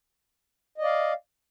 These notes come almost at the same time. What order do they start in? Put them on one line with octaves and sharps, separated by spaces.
D#5 D5 F5